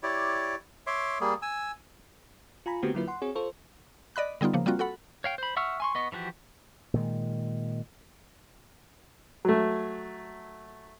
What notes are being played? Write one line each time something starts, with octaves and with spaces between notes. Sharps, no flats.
E4 G4 C#5 D5
C#5 E5 C6 D6
G3 A#3 G#4
G#5 E6
F4 G#5 A#5 B5
D3 A3 B3 C4 F#4 G4
D3 F#3 A#3 E4 F4 B4
F#5 C6
C4 F#4 G#4 C#5
F4 A4 C5 C#6
D5 D#5 B5 F#6
D3 G3 B3 D#4 F4
C#3 F3 A#3
G3 A#3 C4 F4 F#4
F#4 A4 F#5 B5
C#5 F5 G5
C5 B5
E5 F#5 C#6 E6 F6
G#5 C6 C#6
B3 D#5 C#6
E3 F3 F#4 G4
A#2 D#3 G#3
F#3 A3